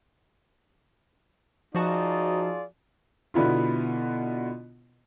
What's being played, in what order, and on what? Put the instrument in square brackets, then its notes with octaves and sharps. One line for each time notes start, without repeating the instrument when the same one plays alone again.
[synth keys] F3 F#4 A5 [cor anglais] D#4 [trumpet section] F4 G#4 D5
[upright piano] B2 D3 B3 E4 F4